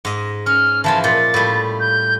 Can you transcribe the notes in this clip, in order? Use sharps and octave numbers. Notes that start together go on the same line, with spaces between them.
G#2 D#5
C#4 F6
E3 F3 G#3 A5
A#2 A6
A2 G3
G6